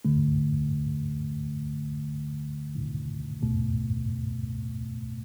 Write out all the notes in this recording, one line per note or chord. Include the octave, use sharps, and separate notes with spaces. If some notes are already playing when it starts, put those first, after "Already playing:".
D2 D3 A3
B1 B2 A3